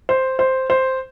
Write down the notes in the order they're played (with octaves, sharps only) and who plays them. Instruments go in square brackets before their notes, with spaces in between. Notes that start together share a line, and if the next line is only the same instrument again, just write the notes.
[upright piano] C5
C5
C5